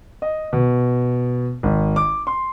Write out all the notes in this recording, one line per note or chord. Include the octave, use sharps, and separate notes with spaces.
D#5
B2
G#1
D6
C6